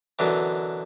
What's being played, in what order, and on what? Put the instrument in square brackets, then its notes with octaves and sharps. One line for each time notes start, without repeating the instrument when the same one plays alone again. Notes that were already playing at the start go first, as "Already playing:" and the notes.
[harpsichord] F#2 B2 D3 E3